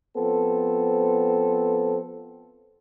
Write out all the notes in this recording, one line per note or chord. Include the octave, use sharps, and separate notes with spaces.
F3 B3 C4 A4